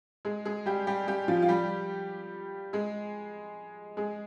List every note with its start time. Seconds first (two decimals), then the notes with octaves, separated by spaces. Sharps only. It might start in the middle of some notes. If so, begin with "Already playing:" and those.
0.25 G#3 G#4
0.45 G#3 G#4
0.66 G3 G4
0.87 G3 G4
1.07 G3 G4
1.28 F3 F4
1.42 F4
1.48 G3 G4
2.73 G#3 G#4
3.97 G#3 G#4